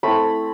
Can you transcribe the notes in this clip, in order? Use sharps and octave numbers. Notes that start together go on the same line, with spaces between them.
A3 C4 E4 B5